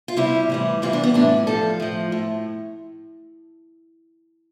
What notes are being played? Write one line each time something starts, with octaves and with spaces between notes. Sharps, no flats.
F4
C3 G3 E4
A2 E3 G3
C3 E3 G3 F4
D4
B3
A2 E3 G3 D4
A2 F3 A4
A2 F3
A2